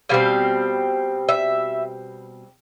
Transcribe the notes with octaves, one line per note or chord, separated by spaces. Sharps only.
B2 G3 C4 F5
E5